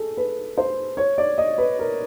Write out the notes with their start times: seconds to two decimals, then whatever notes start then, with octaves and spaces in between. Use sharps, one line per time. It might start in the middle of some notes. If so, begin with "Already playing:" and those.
Already playing: G#4 A4
0.17 B4
0.58 C5
0.97 C#5
1.18 D5
1.38 D#5
1.58 B4
1.79 A#4